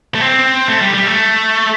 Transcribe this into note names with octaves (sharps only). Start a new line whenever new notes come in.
A3
C4
A3
G3
G3
A3